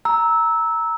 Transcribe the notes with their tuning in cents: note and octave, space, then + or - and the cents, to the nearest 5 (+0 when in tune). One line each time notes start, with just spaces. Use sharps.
A#5 +0 E6 -15